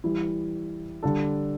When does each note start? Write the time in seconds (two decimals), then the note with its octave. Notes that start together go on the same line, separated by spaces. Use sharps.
0.04 E3 G3 E4
1.03 D3 G3 D4 A4